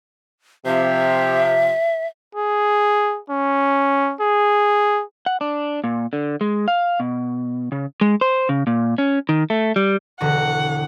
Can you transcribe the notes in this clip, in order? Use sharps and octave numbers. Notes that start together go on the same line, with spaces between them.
C3 F3 E5
G#4
C#4
G#4
F#5
D4
A#2
D3
G#3
F5
B2
C#3
G#3
C5
C#3
A#2
C#4
D#3
A3
G3
E1 D3 F#4 F#5